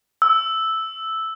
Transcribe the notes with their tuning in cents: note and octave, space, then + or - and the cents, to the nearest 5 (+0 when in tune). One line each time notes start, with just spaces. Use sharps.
E6 -5